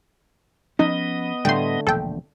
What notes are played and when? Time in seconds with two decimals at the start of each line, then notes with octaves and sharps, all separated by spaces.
0.79 F3 B3 C#4 D#4 D#5
1.45 A2 D3 G3 A3 G5 C6
1.87 E1 A#1 A4 G5